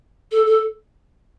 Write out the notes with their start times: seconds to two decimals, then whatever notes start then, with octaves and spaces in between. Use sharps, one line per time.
0.31 A4
0.46 A4